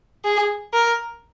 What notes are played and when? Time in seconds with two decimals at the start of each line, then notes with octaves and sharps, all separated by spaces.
0.25 G#4
0.74 A#4